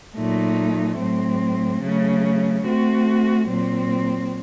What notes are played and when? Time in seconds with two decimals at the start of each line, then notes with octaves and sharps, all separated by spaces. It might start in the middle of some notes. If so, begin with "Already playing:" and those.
0.14 A#2 F#3 A3 D#4
0.98 A2 F#3 C4
1.80 C#3 F#3 A3
2.63 A3 C4 F#4
3.47 A#2 F#3 C4